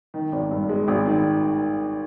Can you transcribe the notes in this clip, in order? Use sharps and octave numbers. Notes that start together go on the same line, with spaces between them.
D#3
G#1
G2
G#3
G#1
D#3